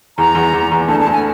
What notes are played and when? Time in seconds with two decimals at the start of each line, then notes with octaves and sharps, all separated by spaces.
0.18 E2 A#5
0.35 E2
0.53 E2
0.71 E2
0.88 D2 A5
1.00 A5
1.07 D2
1.12 G#5